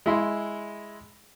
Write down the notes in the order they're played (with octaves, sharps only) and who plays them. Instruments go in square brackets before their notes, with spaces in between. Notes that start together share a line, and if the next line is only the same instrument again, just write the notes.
[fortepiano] G#3 E4 C6